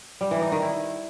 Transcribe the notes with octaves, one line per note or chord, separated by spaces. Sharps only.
G3
E3
D#4
D#3
E4